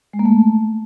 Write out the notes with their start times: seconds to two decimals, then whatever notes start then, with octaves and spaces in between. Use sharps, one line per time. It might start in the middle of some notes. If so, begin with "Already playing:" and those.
0.13 G#3
0.19 A#3
0.25 A3